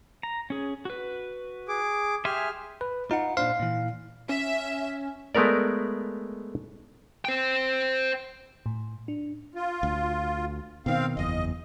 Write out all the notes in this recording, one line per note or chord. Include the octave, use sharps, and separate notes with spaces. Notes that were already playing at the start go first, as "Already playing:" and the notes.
A#5
C#4 G#4
F#4 B4
G#4 D6
G4 G#4 E5 G#5 C6 F6
B4
D#4 F4 F#5
A#2 D4 C5 F5
A#2 E3
C#4 E5
G#3 A3 B3 A#4 D5
C5 G5
A2
D4
F4
D2
B2 D#3 C4 F5
F#1 E2 D#5